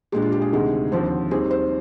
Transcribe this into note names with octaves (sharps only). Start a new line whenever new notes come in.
A#2 G#3 D4 G4
F4
G4
G#4
D2 C3 D#3 G#3
D#2 D3 F3 C4
D#2 D#3 G3 C4 G#4
C5